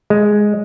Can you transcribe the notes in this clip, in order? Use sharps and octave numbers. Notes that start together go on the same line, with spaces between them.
G#3